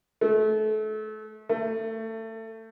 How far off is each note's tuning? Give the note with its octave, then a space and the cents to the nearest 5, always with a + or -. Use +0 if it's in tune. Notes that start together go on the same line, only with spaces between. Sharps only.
A3 -30
A3 +25